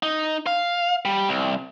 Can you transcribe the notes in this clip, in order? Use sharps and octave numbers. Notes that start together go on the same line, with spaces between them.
D#4
F5
G3
C2